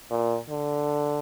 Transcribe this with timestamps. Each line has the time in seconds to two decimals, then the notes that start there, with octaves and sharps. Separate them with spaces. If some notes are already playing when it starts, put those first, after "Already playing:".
0.10 A#2
0.49 D3